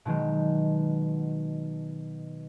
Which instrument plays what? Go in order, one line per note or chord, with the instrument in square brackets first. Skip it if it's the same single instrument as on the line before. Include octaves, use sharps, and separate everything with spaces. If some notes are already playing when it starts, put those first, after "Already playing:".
[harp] B2 D#3 F#3 G#3